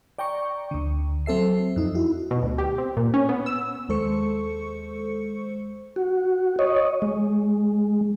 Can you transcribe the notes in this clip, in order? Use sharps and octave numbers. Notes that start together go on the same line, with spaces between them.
D5 G5 A#5 C#6
D2 D3
F#3 C4 A4 E5 C7
F2 D#4
E4 F#4
B2
D2
G4
C4
A#2
C#4
B3
E6
D#2 G#3 A4 C5 C#6 C#7
F#4
C#5 D#5
G#3